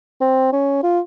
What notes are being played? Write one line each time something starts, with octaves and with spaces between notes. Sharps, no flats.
C4
C#4
F4